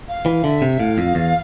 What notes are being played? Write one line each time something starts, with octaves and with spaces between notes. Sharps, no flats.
F5
E3
D3 E5
C3
A2 F5
F2
E2